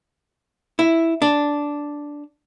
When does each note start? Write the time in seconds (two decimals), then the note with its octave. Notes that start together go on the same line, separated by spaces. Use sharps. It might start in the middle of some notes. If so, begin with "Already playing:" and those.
0.79 E4
1.22 D4